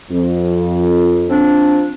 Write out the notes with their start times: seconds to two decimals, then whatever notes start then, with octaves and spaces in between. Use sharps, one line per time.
0.10 F2
1.29 F3 C4 D4